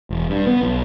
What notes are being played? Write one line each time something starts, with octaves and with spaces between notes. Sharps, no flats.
E1
G2
B3
B1